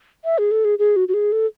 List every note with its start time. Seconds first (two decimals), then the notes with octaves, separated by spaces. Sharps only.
0.25 E5
0.38 G#4
0.51 A4
0.65 G#4
0.79 G#4
0.96 F#4
1.08 F#4
1.14 G#4
1.32 A4